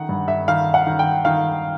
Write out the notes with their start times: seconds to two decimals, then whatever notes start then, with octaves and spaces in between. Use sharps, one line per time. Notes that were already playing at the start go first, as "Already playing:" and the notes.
Already playing: D#3 F#5
0.09 G2
0.28 E5
0.48 D#3 F5
0.74 F#5
0.87 D#3
0.99 G5
1.25 D#3 F5